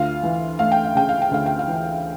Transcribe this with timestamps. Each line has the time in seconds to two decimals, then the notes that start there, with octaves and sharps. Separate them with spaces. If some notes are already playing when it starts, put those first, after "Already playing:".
Already playing: D2 F4 F5
0.23 E3
0.59 A3 F5
0.72 G5
0.84 F5
0.95 C#3 G5
1.09 F5
1.22 G5
1.31 D2 F5
1.46 G5
1.59 F5
1.68 E3